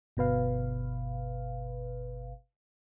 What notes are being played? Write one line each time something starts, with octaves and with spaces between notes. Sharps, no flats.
G1 B2 B4 F5